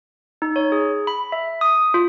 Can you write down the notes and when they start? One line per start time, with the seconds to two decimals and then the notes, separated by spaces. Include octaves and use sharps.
0.42 D#4
0.56 C#5
0.72 G#4
1.07 B5
1.32 E5
1.61 D#6
1.94 F4